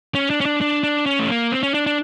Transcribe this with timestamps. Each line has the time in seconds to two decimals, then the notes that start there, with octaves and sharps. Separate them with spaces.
0.15 C#4
0.30 D4
0.41 C#4
0.45 D4
0.61 D4
0.83 D4
1.06 C#4
1.19 A3
1.29 A#3
1.52 C4
1.63 C#4
1.74 D4
1.86 D4